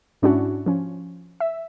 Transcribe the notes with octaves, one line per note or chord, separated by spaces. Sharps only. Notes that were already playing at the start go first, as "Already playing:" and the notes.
G#2 C#4 D4 E4 F#4
F3 C#4
E5